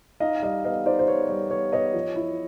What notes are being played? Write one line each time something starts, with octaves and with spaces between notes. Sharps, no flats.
D#4 D#5 F5
G3 D#5 F5
B3 D#5 F5
D#4 C5 D5
C5
B3 C#5
G3 C#5
B3 C#5
B3 C#5 D#5
F3
E4